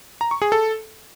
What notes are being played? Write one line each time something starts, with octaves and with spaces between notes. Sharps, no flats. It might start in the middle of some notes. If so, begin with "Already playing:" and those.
A#5
C#6
G#4
A4